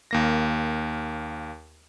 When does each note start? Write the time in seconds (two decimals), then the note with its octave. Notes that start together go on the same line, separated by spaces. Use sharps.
0.11 D#2 A#3 A#6